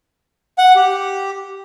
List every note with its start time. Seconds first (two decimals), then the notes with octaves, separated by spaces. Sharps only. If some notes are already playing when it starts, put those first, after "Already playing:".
0.58 F#5
0.76 G4